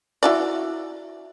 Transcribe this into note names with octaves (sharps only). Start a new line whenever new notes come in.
E4 F#4 D5